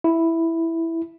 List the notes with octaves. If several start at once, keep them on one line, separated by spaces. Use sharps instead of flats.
E4